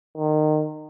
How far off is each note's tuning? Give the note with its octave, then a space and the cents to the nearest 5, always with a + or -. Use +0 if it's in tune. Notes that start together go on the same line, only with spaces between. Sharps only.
D#3 -25